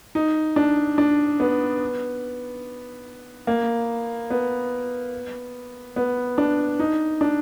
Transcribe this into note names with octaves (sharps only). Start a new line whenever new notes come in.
D#4
D4
D4
B3
A#3
B3
B3
D4
D#4
D4